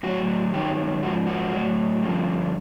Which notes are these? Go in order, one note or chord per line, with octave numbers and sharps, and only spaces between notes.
A2 F#3 F#4
G2 D#3 F#3 G4
G#2 F3 F#4
F#4
A2 F#3
G2 D3 F3